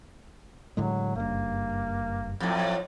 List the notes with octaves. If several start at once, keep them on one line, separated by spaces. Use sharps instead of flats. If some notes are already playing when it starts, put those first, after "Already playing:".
A2 D3 F#3 G#3
F#1 G2 A#3
F2 A2 F#3